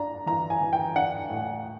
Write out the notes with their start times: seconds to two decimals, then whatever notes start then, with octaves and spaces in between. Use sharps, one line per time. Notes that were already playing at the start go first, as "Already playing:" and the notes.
Already playing: D4 A#5
0.26 E3 A#5
0.50 G#5
0.61 E3
0.73 G5
0.96 D4 F#5
1.30 A2